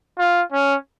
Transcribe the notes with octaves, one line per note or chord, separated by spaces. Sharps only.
F4
C#4